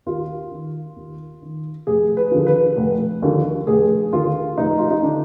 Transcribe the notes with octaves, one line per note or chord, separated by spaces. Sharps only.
D#2 F4
D#3
D#2
D#3
F1 G#4
B4
D#2 D3 F3
B4
F1
D#2 D3 F3
F1 G#4
D#2 D3 F4
F1 D#4
F4
D#4
D3 D4